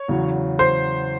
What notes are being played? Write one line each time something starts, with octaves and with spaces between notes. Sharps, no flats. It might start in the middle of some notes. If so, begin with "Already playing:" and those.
Already playing: C#5
E2 C#3 F#3
C5